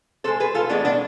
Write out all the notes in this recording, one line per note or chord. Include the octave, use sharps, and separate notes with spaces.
B2 G#3 A4 C5
G#4 B4
F4 A4
A2 E3 G#3 B3 D4
B3 D4